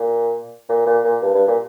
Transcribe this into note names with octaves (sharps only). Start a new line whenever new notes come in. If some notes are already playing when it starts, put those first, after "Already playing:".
Already playing: A#2
A#2
A#2
A#2
G2
G2
A#2